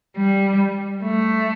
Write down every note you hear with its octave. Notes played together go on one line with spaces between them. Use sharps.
G3
A3